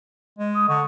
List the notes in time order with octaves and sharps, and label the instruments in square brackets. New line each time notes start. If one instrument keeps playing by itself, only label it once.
[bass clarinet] G#3
[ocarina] D#6
[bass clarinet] D3 [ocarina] C#6